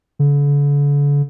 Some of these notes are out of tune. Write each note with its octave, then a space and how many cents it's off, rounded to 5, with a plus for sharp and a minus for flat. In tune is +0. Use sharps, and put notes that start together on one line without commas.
D3 -40